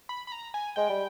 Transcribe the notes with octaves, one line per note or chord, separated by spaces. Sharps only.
B5
B5
A#5
G#5
G#3 G5
G3